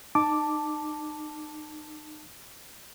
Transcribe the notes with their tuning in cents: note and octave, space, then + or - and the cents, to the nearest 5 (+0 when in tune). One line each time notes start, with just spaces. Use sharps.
D#4 -30 A5 +5 D6 +0